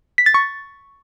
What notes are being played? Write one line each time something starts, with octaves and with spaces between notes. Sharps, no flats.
B6
A6
C#6